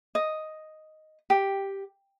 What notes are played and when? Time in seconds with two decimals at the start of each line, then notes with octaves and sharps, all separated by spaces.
0.15 D#5
1.30 G4